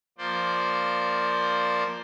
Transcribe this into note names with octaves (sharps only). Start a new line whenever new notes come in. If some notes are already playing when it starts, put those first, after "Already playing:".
F3 A#3 C5 D5